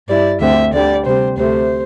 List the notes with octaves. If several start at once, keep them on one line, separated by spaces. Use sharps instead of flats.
G2 G3 E4 D5
D2 D3 C4 E5
D2 D3 G3 D5
C3 G3 C4 C5
D2 C3 A3 C5